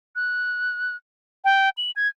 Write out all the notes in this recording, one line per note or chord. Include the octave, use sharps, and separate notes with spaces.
F#6
G5
F#7
G#6